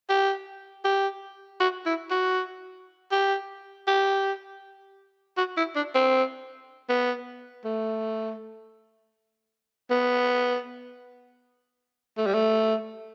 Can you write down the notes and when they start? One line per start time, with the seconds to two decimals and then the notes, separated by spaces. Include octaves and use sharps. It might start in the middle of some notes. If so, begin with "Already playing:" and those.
0.09 G4
0.85 G4
1.60 F#4
1.86 E4
2.11 F#4
3.12 G4
3.88 G4
5.38 F#4
5.57 E4
5.76 D4
5.95 C4
6.90 B3
7.65 A3
9.91 B3
12.17 A3
12.26 G3
12.34 A3